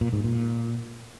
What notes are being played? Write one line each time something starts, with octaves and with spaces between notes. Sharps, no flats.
A#2
G#2
A#2